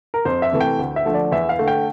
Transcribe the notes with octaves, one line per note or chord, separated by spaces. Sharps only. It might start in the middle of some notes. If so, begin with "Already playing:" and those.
A#4
F2 C5
E5
C3 E3 A3
G5
D2
E5
D3 F3 A3
D5
E2 E5
F5
D3 A3
G5